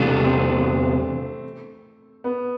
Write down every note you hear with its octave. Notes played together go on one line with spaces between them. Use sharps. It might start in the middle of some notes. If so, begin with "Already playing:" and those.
Already playing: E2 C3 G3 A3 B3 D4
C4
B3